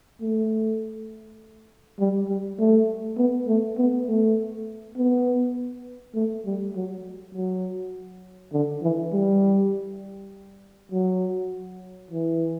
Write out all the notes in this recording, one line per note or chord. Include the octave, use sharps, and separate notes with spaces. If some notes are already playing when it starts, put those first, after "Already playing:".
A3
G3
G3
A3
B3
A3
B3
A3
B3
A3
G3
F#3
F#3
D3
E3
G3
F#3
E3